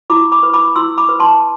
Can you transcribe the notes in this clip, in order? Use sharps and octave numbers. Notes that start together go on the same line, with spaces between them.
E4 B5 D6
B5 D6
B4
B5 D6
E4 C6 E6
B5 D6
B4
A5 C6